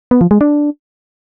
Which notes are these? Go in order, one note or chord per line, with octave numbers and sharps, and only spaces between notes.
B3
F3
G#3
D4